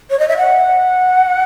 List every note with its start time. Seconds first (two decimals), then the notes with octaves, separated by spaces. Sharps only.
0.10 C#5
0.19 D#5
0.28 E5
0.37 F#5